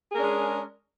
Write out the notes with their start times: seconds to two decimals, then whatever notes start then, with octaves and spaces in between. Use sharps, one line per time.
0.10 G#4
0.13 A#4
0.16 C#4
0.20 D4
0.23 G#3